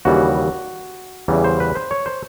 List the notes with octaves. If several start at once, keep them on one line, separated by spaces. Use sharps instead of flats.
D#2 C#3 E3 G3 F#4
E2 C#3 E3 G3
C5
B4
C5
C#5
C5